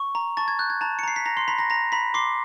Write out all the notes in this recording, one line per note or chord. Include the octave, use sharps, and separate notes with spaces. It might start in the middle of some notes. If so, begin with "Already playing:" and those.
Already playing: C#6
A#5
A5 C#6 A6
G#6
F#6 G6
G#6
A5 A#5 A6
C#7
A#5 C7
B6
A#5 A#6
C6 C7
A#5 B5 B6
A#5 A#6
A#5 A#6
A#5 B5 B6
C6 D6 C7